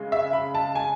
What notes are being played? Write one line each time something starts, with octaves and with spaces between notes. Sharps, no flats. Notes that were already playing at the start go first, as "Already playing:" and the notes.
Already playing: C#3 G#3
E5
B5
A5
G#5